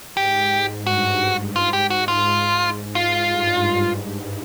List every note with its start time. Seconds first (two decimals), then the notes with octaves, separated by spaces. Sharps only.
0.16 G#2 G4
0.86 G2 F#4
1.56 G#2 F4
1.73 G4
1.90 F#4
2.08 F4
2.95 G#2 F4
3.29 G2
3.64 G#2
3.99 G#2